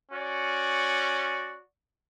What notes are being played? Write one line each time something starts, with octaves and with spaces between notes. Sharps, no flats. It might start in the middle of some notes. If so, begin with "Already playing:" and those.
C#4 F#4 D5